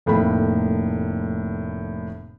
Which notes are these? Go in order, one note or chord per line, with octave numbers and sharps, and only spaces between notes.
F1 A2 A#3 B5